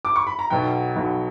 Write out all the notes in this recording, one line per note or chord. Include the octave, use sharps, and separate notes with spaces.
D6
C#6
B5
A#5
B1 B2 F#3 B3 G5
B1 B2 F#3 B3